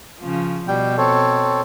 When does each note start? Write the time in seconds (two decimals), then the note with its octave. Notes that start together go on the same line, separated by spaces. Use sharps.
0.20 C#3 F3
0.68 B2 G3 G5
0.98 C4 A4 C#5